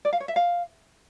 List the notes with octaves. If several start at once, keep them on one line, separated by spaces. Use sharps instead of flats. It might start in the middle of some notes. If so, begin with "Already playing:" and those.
D5
F5
C#5
E5
F5